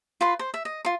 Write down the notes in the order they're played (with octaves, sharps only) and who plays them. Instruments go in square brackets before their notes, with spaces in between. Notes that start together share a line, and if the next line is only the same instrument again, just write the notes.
[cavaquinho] F4 B4 C6
C5
E5
D#5
F4 C6